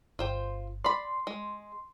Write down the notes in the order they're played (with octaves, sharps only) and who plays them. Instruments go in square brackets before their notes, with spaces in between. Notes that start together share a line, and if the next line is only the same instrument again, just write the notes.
[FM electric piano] G1 [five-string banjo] F4 C5 G5
[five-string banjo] D5 B5 [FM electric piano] C6
[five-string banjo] G#3